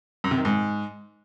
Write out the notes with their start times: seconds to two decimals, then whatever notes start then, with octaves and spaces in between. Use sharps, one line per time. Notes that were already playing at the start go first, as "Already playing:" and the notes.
0.24 F#2
0.31 C3
0.38 D#3
0.45 G#2